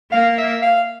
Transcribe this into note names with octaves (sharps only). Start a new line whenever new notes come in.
A#3 F5
E5
F5